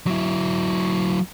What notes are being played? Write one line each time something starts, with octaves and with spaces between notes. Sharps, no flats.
F#3 E4